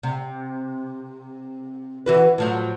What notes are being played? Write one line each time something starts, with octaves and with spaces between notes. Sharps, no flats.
C3
E3 F#4 B4
A2 F3 F#3